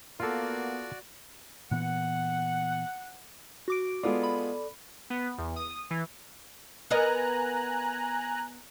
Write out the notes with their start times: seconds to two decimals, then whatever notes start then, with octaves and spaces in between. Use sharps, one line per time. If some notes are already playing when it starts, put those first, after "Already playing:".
0.20 A#3 B3 F4 F#4 A4 D5
1.71 A#2 E3 B3 F#5
3.68 F#4 D6 D7
4.03 G#3 B3 F4 A4 D5
4.23 B5
5.10 B3
5.38 E2
5.56 D#6
5.91 E3
6.90 B3 A#4 D#5 G#5 A#5 F#6